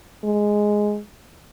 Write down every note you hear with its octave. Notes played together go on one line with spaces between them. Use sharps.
G#3